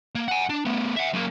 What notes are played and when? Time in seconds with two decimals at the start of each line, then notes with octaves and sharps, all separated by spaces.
0.15 A#3
0.28 F#5 G#5
0.49 D4
0.65 A3 B3
0.97 E5 F#5
1.14 F#2 A#3